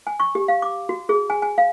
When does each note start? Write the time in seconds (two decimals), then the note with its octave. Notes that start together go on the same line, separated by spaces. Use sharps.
0.07 G#5
0.20 C#6
0.35 G4
0.48 F5
0.62 D6
0.89 F#4
1.09 G#4
1.30 G#5
1.42 G#5
1.58 F5